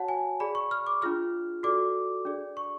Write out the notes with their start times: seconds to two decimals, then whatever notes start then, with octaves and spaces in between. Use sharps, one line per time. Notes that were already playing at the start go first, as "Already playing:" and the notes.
Already playing: F#4 C#5 F#5 A5
0.08 G#5
0.40 G#4 D5 B5
0.55 C#6
0.71 F6
0.87 D6
1.02 D4 F4 G#4 F6
1.63 F#4 A4 D5 D6
2.25 D4 G#4 D5
2.57 C#6